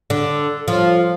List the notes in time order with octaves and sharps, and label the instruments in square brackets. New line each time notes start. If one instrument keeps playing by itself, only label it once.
[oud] D3
F3